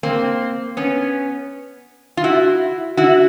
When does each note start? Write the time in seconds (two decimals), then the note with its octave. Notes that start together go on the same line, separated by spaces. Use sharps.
0.03 A#3 C4
0.77 B3 C#4
2.17 F4
2.24 E4 F#4
2.97 E4 F#4